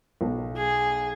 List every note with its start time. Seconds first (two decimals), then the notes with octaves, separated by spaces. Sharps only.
0.21 B1
0.57 G#4